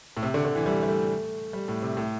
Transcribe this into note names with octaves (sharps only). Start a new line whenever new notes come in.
A2
C3
D3
D3
E3
G3
G3
A3
G3
A2
C3
A2